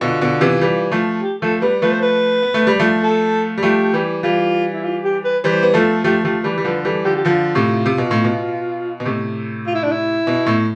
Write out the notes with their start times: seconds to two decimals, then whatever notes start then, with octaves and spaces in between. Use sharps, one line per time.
0.01 B2 D3 F4
0.21 B2 D3
0.41 C3 E3
0.61 E3 G3
0.92 F3 A3
1.22 G4
1.42 F3 A3 A4
1.62 G3 B3 B4
1.82 F3 A3 B4
1.92 C5
2.02 B4
2.42 B3
2.54 A3
2.67 G3
2.79 F3 A3
3.03 A4
3.58 G3
3.63 F3 A3 G4
3.93 E3 G3
4.23 E3 G3 F4
4.74 E4
4.84 F4
5.04 G4
5.24 B4
5.44 E3 G3 C5
5.63 B3
5.74 F3 A3 A4
6.04 F3 A3 G4
6.24 F3 A3 G4
6.44 E3 G3 B4
6.58 G3
6.65 D3 F3 B4
6.85 E3 G3 A4
7.05 D3 F3 G4
7.16 G4
7.25 D3 F3 F4
7.55 A2 C3
7.86 C3
7.98 B2
8.11 A2
8.24 B2
9.00 B2
9.05 A2 C3
9.67 F4
9.75 E4
9.83 D4
9.91 E4
10.27 B2
10.46 A2